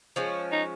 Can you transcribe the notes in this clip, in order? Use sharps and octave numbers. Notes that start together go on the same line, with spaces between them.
F3 G#3 C#4
D#4